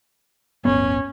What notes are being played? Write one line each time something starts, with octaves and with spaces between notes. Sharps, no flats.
D1 G1 B3 C#4